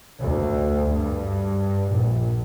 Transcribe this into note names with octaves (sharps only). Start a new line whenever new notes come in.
D2
G2
A#1